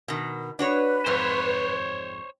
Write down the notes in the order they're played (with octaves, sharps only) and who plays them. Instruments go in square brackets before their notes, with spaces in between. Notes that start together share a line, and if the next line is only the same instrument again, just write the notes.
[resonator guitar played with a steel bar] B2 D#3
[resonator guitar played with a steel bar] D4 F#4 C#5 [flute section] B4
[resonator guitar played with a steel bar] F2 G#2 C4 [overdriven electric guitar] C5 C#5